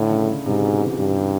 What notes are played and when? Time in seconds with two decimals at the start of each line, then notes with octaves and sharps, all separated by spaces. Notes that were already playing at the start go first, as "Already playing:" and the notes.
Already playing: A2 D3
0.11 C#3
0.28 C#3
0.46 G#2 C3
0.64 B2
0.81 E3
0.99 G2